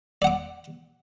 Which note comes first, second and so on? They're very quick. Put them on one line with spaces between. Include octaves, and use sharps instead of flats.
D5 F#5 D6